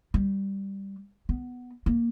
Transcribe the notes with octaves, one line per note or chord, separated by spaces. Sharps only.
G3
B3
A#3